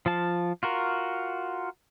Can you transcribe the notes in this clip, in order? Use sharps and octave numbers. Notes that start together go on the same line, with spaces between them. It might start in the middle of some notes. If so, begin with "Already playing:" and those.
F3 F4 A5
F4 F#4 A#4